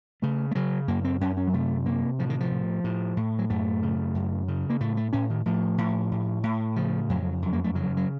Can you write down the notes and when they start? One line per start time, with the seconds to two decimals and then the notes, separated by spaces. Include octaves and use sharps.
0.22 C#3 A3
0.51 A3
0.55 C#3 F#3
0.88 F#2 A#3
1.04 C4
1.21 F#2 C#4
1.37 C#4
1.47 F#3
1.54 C3 A3
1.86 C3 A#3
2.19 A2 F3
2.30 D#3
2.40 F3
2.51 A2
2.84 A2
3.17 A2
3.39 F#3
3.50 F#2 A3
3.83 C#3
4.15 F#2
4.48 C#3
4.70 A#3
4.80 A2 A3
4.97 A3
5.13 A2 C#4
5.30 D#3
5.46 A2 F3
5.78 A2
6.12 A2
6.43 A2
6.76 C#3 F3
7.10 F2 F#3
7.42 F#2
7.53 A#3
7.64 A3
7.75 C#3 F#3
7.97 F#3